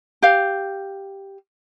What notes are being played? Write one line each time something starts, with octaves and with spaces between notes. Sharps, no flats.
G4 F5